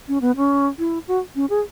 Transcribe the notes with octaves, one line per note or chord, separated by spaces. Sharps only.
C#4
B3
C#4
E4
F#4
C#4
G#4